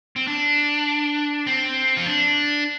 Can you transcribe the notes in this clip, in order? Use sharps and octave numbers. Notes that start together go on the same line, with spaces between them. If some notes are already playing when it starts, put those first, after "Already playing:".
C4
D4
C4
F4
D4